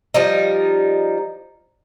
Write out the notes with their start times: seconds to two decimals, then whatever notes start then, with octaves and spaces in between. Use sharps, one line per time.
0.14 F3 G3 D#4